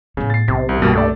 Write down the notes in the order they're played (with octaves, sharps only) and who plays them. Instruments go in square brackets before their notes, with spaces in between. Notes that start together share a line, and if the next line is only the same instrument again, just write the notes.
[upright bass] A2 B3 [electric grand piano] C#3
[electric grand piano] A6 C7
[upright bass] B1 [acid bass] C3
[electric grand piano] C2
[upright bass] C2 [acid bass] G2 [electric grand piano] B2 G3 A#3
[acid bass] G2 [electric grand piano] A3 A4 D5